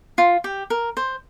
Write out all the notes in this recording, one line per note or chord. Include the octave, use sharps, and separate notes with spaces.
F4
G4
A#4
C5